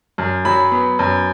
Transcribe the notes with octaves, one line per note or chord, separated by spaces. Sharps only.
F#2
F#3 B5
B3
F#2